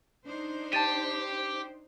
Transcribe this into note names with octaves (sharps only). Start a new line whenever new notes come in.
D4 D#4 C5
G4 A5 A6 D#7